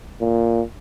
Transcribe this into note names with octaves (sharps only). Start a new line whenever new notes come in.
A#2